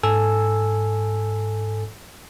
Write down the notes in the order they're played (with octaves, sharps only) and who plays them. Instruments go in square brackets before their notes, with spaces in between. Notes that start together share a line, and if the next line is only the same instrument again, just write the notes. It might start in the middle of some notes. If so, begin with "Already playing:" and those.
[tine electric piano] G#2 A4 G#5 E6